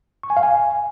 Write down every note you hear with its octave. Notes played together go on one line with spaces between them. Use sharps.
C#6
G#5
F5
G#5